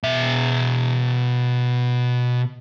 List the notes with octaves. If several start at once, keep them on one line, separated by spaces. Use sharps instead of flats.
B2 E5